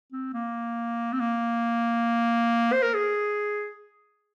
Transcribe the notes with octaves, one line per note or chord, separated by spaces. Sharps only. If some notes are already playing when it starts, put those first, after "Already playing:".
C4
A#3
C4
A#3
C5
A#4
G#4